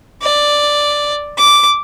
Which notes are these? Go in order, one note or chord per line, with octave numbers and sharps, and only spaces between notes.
D5
D6